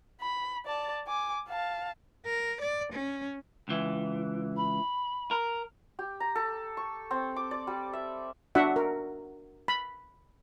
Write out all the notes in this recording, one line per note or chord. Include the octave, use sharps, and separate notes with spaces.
B5
D5 A5
G#5 D6
F5 A5
A#4
D5
C#4
C#2 E3
B5
A#4
G4
A#5
A4
C#6
C4
D6
D5
G3
E5
D4 F#4 E5 F#5
A#4
B5